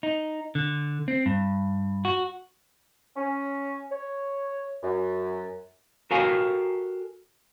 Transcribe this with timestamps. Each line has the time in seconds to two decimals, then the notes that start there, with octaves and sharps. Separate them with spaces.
0.03 D#4
0.55 D3
1.08 C4
1.26 G2
2.05 F#4
3.17 C#4
3.92 C#5
4.83 F#2
6.11 F#4 G4 A4 A#4 F5 G#5